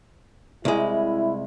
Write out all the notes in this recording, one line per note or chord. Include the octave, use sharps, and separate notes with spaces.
C2 G#3 E4